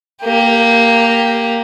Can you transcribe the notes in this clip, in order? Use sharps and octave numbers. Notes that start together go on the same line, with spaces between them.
A#3 G4